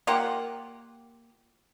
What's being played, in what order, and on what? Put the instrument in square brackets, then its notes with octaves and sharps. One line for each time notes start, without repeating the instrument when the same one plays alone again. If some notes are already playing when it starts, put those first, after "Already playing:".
[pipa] A#3 F4 G4 F#5